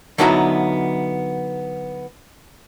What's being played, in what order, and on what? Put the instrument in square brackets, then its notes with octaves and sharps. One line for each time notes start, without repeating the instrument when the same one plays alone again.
[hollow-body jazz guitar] D3 F#3 B3 D#4 E4 A#5